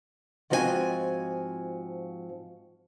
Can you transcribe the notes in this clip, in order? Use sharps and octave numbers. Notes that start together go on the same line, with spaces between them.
G#2 F3 C4 F#4 A#4 G#5